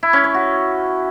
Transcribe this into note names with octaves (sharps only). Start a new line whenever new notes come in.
E4
C#4
C#5
F#4